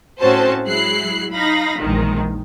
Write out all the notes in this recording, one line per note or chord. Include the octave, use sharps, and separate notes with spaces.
A2 C4 C#4 F#4 C5 A5
F#3 G#3 E4 F#6 C7
D#4 F5 B5 A#6
A#1 E2 D#3 G#3